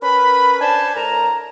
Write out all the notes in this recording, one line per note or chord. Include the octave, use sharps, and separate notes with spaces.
C#4 A#4 B4 B5
D4 C5 G#5 A5
A2 A#4 A#5